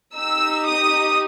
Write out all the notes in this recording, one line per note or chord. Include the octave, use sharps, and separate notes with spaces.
D#4 G4 E6
D#6